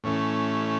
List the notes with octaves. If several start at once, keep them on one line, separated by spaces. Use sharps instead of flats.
A2 E3 A3 C#4